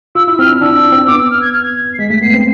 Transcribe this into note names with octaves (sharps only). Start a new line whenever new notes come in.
F4 E6
E4 E6
C4 F6
D4
D4 E6
D4
C4
B3 D6
E6
F6
G#6
F6
G#6
C7
G#3 B6
A3 B6
B3 C7
C4